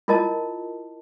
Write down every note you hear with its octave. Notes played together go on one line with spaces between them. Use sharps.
E4 F4 A#4 D#5 A5